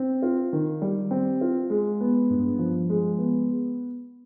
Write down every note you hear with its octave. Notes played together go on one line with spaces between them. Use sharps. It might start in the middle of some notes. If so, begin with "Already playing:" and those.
Already playing: C4
F4
D#3
G3
C4
F4
G#3
B3
G2
F3
G#3
B3